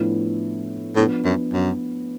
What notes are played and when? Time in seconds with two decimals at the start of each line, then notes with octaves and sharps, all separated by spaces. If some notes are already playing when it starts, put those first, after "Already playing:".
Already playing: A2 F3 B3 D4
0.96 A2 F3 B3 D4
1.25 F#2
1.54 F#2